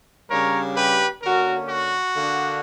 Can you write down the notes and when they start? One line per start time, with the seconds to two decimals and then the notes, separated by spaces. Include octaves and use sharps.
0.31 C#3 G3 A#3 D4 A#4 C#5
0.77 G4 B4
1.23 D3 A#3 C#4 F#4 A#4
1.68 F#4
2.15 D3 A#3 D4